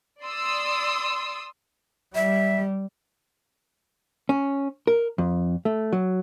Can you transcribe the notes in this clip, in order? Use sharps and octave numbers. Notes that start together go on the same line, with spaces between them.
D5 C6 D#6 E6
G3 E5
C#4
A#4
F2
A3
F#3